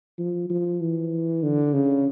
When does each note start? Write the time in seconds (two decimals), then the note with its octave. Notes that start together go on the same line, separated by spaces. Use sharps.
0.19 F3
0.50 F3
0.81 E3
1.43 D3
1.74 C#3